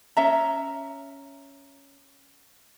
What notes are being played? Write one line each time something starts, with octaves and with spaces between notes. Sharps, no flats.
C#4 E5 A#5